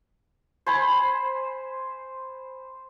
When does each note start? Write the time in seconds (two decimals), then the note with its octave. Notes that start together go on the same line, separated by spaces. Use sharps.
0.66 C5 G#5 B5